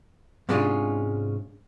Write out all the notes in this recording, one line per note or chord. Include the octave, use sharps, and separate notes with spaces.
G#2 C3 G#3 C#4 D4 F4